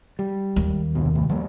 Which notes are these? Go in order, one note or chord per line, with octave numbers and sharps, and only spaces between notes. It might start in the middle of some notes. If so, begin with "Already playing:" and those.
G3
D#2
C2 G2 B2
C2 A2
F3 G3 A#3